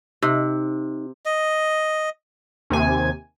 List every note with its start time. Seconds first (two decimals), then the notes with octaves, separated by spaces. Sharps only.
0.22 C3 D#4
1.26 D#5
2.70 D#2 C3 G#5